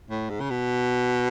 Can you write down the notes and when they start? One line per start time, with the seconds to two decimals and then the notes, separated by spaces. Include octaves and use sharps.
0.10 A2
0.30 G#2
0.41 C#3
0.50 B2